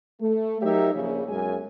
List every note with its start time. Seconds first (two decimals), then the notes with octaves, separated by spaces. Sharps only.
0.21 A3
0.62 F#3 D#4 G4 A#4 C#5 E5
0.94 A#1 C#3
1.28 B1 F#2 G#3 G#5